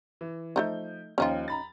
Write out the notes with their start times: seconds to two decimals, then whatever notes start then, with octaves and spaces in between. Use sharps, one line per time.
0.21 E3
0.56 F3 A3 D4 D#4 G6
1.18 D#2 F3 C#4 D#4 F4
1.48 A#5 B5 A6